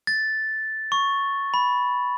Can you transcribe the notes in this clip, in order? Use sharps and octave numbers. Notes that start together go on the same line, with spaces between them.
A6
C#6
B5